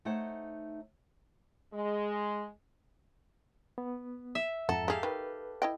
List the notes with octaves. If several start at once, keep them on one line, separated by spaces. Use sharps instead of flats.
A3 D#4 C5 C#5 F#5
G#3
B3
E5
F2 G#2 A4 F#5 A#5
G#3 G4 G#4 F5
D#3 B4
E4 D#5 G5